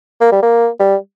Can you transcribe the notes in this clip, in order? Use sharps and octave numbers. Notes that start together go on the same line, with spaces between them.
A#3
G3
A#3
G3